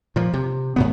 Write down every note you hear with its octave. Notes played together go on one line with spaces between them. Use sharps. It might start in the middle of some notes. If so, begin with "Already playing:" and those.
A#2 F3
C3
G#2 D#3 B3